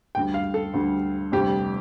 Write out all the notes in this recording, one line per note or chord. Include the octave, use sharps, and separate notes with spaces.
D2 D3 G3 G5
F5
A4
D2 D3 G3
F1 F2 D3 G3 G4